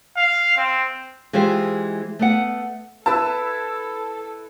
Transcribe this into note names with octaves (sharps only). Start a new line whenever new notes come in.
F5
C4
E3 G#3 F4 G4 C5
A3 B3 F#5
E4 A4 B4 A5 E6